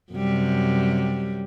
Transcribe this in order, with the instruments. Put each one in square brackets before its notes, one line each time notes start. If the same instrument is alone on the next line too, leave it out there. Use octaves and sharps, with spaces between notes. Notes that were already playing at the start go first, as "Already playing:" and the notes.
[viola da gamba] F#2 C3 G3